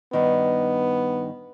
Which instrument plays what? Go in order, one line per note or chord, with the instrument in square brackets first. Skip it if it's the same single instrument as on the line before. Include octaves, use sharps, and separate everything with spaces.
[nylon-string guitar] G2 D#3 [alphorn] B3